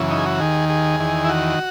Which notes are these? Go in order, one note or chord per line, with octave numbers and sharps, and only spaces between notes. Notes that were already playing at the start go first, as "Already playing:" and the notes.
Already playing: F#2 C#3 E3
D#4
G#4
F#4
D#2 D#3 G#4
G#4
E2 D#3
E4
F#4